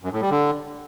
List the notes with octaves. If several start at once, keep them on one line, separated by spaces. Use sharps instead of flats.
F#2
A2
G3
D3